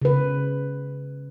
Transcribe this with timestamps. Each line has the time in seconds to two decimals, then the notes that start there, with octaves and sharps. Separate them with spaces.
0.02 C#3 B4